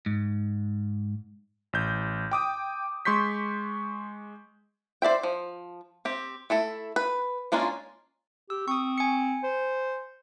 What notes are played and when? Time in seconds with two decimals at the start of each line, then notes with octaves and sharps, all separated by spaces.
0.06 G#2
1.73 A1 G6
2.31 G5 D6 D#6
3.05 G#3 C6 C#6 G6 B6
5.02 C5 D5 E5 G5
5.23 F3
6.05 C4 G4
6.50 A3 E4 A4
6.96 B4
7.52 G#3 A#3 C#4 D4 F4
8.50 G4 E6
8.68 C4 C#6 D#6
8.98 G#5 C#7
9.44 C5